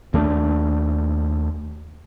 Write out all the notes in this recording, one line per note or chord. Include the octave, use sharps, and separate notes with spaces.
D#2 A3 A#3 D4